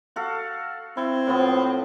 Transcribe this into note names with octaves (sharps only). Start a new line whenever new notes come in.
F#4 A4 F5
C4 E4
A2 F3 B3